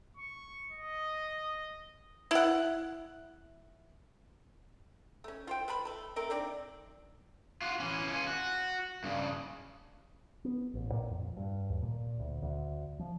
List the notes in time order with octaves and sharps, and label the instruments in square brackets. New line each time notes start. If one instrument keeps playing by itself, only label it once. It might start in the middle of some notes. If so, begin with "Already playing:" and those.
[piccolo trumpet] C#6
D#5
[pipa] E4 F#5
A3 C#4
F4 C5 G5
B4 C5 A5 B5
A3 A5
A3 C4 A#4
C4 D4 D#4 D5
[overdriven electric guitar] F4 F#4
E3 C#4
C#4 F4
F#4
G2 C#3
[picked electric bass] B3
A1
A#2
F2
G2
D#2
A#2
D2
D2
F3